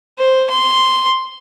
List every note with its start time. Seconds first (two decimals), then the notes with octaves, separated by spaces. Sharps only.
0.19 C5
0.50 C6